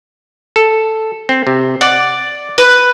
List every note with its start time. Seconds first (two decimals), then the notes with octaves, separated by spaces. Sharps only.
0.56 A4
1.29 C4
1.47 C3
1.81 D5 F#5
2.58 B4